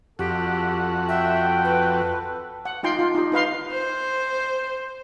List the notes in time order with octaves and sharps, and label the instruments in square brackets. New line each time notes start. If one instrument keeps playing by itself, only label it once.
[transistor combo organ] F2 F#4 [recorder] G4 [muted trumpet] A4
[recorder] E5 [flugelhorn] G5
[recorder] B4
[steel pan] F#5
D#4 F4 G5 C6
F4
D#4 G4
D#4 B4 F5 C6
[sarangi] C5